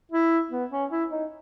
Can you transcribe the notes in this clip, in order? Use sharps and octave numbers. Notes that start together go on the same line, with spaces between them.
E4
B3
C#4
E4
D#4